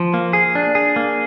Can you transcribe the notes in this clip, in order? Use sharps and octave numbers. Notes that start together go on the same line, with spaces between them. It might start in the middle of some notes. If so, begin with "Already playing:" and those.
Already playing: F3
A#3
G#4
D4
G#4
A#3